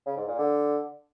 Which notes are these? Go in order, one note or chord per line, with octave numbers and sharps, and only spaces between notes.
C#3
G#2
A#2
D3